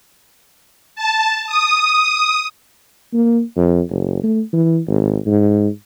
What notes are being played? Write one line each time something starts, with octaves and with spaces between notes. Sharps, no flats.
A5
D#6
A#3
F2
F#1
A3
E3
G#1
G#2